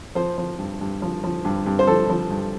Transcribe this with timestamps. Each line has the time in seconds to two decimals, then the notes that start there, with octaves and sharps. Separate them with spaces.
0.15 F3 C5
0.38 F3
0.58 G2
0.81 G2
1.02 F3
1.24 F3
1.45 G2
1.66 G2
1.79 C5
1.87 F3 A4
2.10 F3
2.30 G2